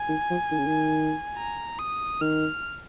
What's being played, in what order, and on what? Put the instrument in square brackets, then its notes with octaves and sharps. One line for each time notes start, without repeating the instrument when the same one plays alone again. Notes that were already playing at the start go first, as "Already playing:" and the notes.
Already playing: [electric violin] G#5
[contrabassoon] D#3
F3
D#3
C#3
D#3
[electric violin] A#5
D#6
[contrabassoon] D#3 [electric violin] F6